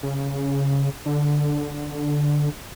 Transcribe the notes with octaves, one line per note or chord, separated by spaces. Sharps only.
C#3
D3